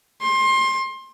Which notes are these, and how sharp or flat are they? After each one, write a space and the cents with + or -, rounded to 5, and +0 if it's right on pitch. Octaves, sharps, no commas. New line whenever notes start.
C6 +25